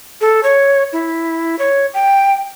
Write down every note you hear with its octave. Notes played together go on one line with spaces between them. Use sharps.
A4
C#5
E4
C#5
G5